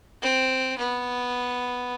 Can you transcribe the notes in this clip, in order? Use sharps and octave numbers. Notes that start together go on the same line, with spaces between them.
C4
B3